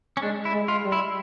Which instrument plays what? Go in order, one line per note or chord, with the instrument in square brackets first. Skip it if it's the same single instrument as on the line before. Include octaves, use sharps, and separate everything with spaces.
[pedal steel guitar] C#4
[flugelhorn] G#3 [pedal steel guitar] D4
[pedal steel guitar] E4
[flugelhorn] G#3
[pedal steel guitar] F4
[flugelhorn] G3
[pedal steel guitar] E4